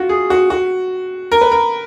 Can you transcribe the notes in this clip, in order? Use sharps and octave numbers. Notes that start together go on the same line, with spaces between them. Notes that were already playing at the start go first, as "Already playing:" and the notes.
Already playing: F4 F#4
G#4
F#4
F#4
A#4
B4
A#4